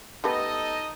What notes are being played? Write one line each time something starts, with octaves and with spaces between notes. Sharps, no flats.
G3 A3 B3 D#4 A4 D#5